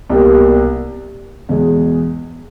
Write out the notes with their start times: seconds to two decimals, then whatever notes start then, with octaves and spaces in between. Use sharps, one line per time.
0.10 C2 B2 G3 A#3
1.49 E2 B2 G#3